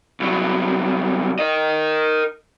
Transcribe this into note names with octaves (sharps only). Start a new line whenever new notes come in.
C2 F#3
A#4 D#5